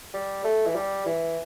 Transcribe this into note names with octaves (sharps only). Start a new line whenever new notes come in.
G3
A3
E3
G3
E3